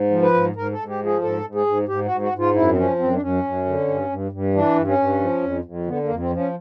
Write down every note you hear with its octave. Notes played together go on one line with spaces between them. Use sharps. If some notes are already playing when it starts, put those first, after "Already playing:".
Already playing: G#2
F3
B4
G#2
G#2 A#4
A4
G#2
G4
F3
G#4
G#2 A4
G#2
G#4
G#2
G#2 G4
F#4
G#2
F#4
G#2
F4
F#2 E4
C4
F3 C#4
F#2 C4
D4
F#2 C#4
F#2
D3
G2
G2
G2
E3 D4
G2
C#4
G2
F3
F2
F2
D3 B3
A#3
F2
C4
F3
C#4